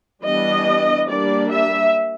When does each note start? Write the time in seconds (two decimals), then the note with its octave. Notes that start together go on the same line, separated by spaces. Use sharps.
0.24 E3 G3 B3 D4 D#5
1.08 G3 A#3 D4 D5
1.50 E5